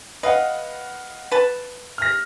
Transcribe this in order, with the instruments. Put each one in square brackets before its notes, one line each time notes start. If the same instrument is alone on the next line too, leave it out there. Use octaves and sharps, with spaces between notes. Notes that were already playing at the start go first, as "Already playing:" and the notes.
[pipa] B4 [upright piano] D#5 F5 F#5
[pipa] B4 A5
[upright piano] F6 A#6